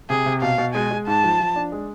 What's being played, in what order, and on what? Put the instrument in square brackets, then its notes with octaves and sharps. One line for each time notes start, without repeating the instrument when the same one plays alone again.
[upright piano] C3 [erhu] G#4
[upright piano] C3
[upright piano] B2 [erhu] F5
[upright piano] B2
[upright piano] G#3 [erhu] G#5
[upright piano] G#3
[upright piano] G#2 [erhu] A5
[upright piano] F3
F3
D4
G#3